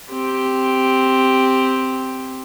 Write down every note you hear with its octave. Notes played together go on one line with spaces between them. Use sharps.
C4 G4